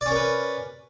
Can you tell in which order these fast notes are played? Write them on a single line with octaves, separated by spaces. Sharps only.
D5 C#4 A#4 B4